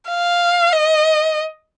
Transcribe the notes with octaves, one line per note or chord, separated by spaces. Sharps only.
F5
D#5